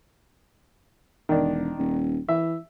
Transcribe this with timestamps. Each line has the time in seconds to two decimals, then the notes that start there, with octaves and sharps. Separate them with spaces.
1.29 E1 D#3 D4
1.78 D#1
2.29 E3 E5